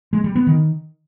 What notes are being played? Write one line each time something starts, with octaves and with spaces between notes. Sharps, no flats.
G#3
G3
B3
D#3